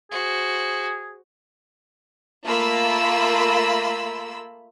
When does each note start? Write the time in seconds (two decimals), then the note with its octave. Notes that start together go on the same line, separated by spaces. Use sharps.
0.11 F#4 G#4 C5
2.45 A3 A#3 F4 B5 E6